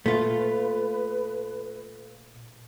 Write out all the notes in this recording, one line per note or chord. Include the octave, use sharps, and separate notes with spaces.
A#2 A3 F4 B4